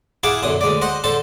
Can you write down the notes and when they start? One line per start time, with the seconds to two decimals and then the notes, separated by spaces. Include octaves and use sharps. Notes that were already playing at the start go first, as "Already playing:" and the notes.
0.23 E4 G#4 F5 F#5 A5 D6
0.43 B1 F#2 D3 D#6
0.61 D2 G#3 D5
0.82 C5 D#5 F#5
1.04 D3 A4 C5 A5